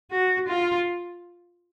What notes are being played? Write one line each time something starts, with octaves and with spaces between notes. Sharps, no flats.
F#4
F4